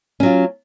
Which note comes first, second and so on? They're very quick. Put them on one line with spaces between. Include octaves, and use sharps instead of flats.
C#4 F#3 F4